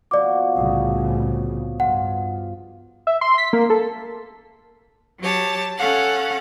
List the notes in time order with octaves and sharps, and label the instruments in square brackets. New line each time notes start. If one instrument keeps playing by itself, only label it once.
[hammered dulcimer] B2 F3 F#4 [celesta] D5 D6
[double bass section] C2 A2 C#3 [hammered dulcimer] G#4
[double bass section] G2 [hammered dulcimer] F4 [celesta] F#5
[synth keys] E5
C6
B6
A#3
A4
[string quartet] F#3 G4 C#5 A5
C#4 A4 F5 F#5